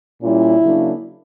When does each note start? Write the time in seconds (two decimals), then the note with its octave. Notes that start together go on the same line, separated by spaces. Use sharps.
0.22 A#2 G3 C#4 E4
0.61 C#3 F#3 A#3 D4